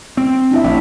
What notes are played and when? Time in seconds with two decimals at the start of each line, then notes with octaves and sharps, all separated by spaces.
0.17 C4
0.51 D4 E4 E5
0.64 A1